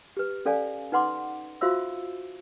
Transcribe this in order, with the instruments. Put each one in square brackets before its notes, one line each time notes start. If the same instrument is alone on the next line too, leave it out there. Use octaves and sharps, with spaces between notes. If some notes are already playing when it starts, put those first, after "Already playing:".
[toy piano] G4 B4
C#4 A4 D5 F5 G#5
D#4 B4 F#5 C6 D6
F4 F#4 C5 E5 F5 E6